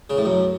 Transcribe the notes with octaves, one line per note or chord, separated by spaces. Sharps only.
C#3
A2
F#2